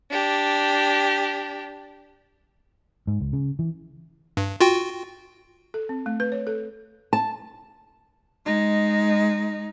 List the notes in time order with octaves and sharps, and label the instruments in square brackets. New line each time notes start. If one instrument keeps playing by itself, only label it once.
[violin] D4 G4
[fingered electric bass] G#2
C#2
C#3
E3
[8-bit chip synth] G2
F4 F#4 G5
[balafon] A4
C4
A3
B4
C#5
A4
[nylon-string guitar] A5
[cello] G#3 D#4